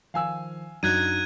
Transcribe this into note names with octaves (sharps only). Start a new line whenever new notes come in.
D#3 F3 F5 G#5 E6
F#2 F#3 D4 D#4 F#6 G#6 D#7